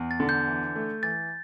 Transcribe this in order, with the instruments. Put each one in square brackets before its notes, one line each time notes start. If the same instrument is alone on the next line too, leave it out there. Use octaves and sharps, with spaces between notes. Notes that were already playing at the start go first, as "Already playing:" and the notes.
Already playing: [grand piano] E2
[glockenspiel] A6
[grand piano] D3
[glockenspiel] G6
[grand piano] E3
A3
[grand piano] E3 [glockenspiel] A6